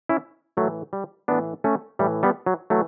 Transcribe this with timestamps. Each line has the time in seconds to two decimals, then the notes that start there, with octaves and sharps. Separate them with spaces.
0.09 C#4 E4
0.57 A2 E3 F#3 A3
0.93 G3
1.28 A2 E3 B3 D4
1.64 A3 C#4
1.99 A2 E3 G3
2.23 G3 B3
2.46 F#3
2.70 E3 F#3 A3